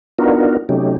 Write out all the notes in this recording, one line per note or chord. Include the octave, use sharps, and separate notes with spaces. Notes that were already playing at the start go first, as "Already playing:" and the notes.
B3 D4 D#4 F4 F#4 A#4
C3 F#3 A3 C#4 D#4 G4